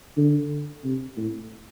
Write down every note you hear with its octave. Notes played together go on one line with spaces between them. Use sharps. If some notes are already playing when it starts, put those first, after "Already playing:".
D3
C3
A2